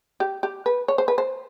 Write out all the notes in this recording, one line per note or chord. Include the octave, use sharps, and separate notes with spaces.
G4
G4
B4
C#5
C5
B4
C5